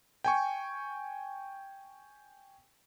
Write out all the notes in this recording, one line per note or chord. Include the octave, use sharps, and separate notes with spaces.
G5 G#5 C#6